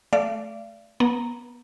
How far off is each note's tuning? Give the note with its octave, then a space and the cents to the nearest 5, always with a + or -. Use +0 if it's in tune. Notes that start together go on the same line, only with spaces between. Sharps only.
A3 -15 D5 -10 F5 -45
B3 -35 A#5 -5